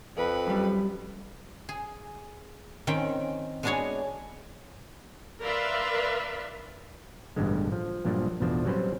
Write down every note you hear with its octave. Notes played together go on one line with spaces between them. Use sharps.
F2 B4
F#2 G3
G#4
D#3 C4 C#4 G5
G#3 B3 D4 F#4 G#4 C#5
A#4 B4 D5 E5 F5 C6
A1 G2 B2 D3 G#3
F3
G2 A#2 F3 F#3 D4
A1 E2 B2 F3 D4 C5
F#3 G3 C4 C#4 B4 C5